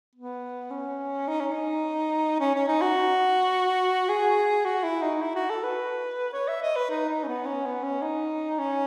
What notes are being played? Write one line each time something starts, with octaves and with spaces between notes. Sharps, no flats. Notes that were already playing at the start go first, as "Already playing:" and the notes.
B3
C#4
D#4
C#4
D#4
C#4
C#4
D#4
F#4
G#4
F#4
E4
D#4
E4
F#4
A4
B4
C#5
E5
D#5
B4
D#4
D#4
C#4
B3
C#4
B3
C#4
D#4
C#4